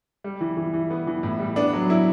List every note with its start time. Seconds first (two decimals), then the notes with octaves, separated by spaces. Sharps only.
0.24 G3
0.41 E3
0.57 E3
0.74 E3
0.90 B3
1.07 E3
1.23 A2
1.40 G3
1.56 B3 D4
1.73 F#3
1.90 E4